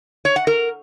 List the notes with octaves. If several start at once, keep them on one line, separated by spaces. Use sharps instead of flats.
C#5
F#5
A#4